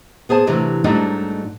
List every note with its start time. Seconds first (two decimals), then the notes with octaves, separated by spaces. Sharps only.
0.29 B3 G#4 C5 A5
0.47 C3 E3 F#3 A3 D4 G4
0.84 G#2 F#3 G3 A3 D4 D#4